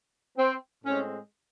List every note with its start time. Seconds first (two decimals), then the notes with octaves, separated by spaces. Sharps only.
0.36 C4
0.84 A2 G#3 C4 C#4